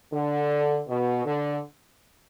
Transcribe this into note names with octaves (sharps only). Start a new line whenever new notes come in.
D3
B2
D3